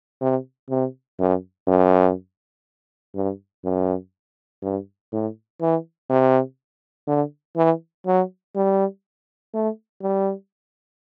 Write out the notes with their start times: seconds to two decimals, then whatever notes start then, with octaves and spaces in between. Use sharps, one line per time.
0.21 C3
0.70 C3
1.19 F#2
1.67 F#2
3.14 G2
3.64 F#2
4.62 G2
5.12 A2
5.61 E3
6.10 C3
7.07 D3
7.56 E3
8.07 F#3
8.56 G3
9.54 A3
10.02 G3